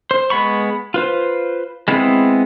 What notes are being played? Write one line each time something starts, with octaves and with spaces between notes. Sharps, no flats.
C5
G#3 B3 B5 C#6
F4 B4 C5
G#3 B3 C4 E4 G#4